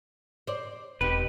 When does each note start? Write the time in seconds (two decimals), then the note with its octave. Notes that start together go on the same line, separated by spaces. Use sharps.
0.47 C5 D5
1.01 E1 C4 D#4 G4 B4